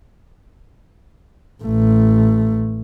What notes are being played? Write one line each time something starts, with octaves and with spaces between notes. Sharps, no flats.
A1 A3